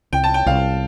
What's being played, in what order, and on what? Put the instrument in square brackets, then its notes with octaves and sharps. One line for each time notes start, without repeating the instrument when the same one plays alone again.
[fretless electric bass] C2 [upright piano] G5
[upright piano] A5
G5
[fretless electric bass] C2 [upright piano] F5